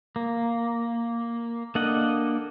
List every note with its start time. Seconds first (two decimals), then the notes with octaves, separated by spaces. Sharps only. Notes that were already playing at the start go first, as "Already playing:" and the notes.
0.16 A#3
1.75 A#3 D4 A4 D#5 F#5